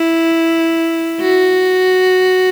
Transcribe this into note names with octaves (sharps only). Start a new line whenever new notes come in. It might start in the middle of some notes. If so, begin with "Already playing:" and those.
Already playing: E4
F#4